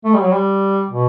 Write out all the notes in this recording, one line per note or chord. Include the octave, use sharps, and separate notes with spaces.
A3
G3
F#3
G3
B2